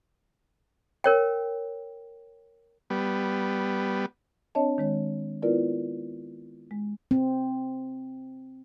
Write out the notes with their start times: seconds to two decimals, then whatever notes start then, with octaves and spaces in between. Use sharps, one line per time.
1.04 A#4 C#5 G5
2.90 G3 B3
4.55 C4 D4 C#5 D#5 A5
4.78 D#3 G#3 C#5
5.42 B3 E4 F4 A#4 B4 D5
6.71 G#3
7.11 C4